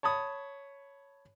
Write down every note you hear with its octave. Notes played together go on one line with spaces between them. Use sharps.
C#5 A5 B5 D#6